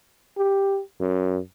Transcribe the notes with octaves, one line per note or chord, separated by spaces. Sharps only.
G4
F#2